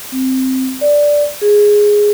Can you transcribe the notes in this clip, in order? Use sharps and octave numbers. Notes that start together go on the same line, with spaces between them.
C4
D5
G#4